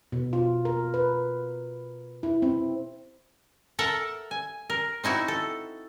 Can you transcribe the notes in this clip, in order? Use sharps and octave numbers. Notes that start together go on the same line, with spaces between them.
B2
F4
A#4
B4
E4
C4
A4 A#4 E5 F#5 A5
G#5
A#4
C4 D#4 E4 F#4
A4